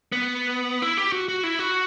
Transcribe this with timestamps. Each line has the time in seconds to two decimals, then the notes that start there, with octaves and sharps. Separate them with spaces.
0.12 B3
0.82 E4
0.97 G4
1.12 F#4
1.29 F#4
1.43 E4
1.59 F#4